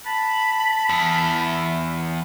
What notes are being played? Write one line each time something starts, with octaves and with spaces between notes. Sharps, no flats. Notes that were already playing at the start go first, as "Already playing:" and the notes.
A5 B5
E2